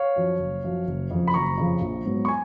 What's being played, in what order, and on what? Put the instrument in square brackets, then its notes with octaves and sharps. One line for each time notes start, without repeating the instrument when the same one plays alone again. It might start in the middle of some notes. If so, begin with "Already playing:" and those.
Already playing: [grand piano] C#5 F5
F#2 F3
F#1
F#2 F3
F#1
F2 C#3 F3
B5
F#1 A#5 C#6
F2 C#3 F3
A#1
G#2 F#3 B3
C#6
G#5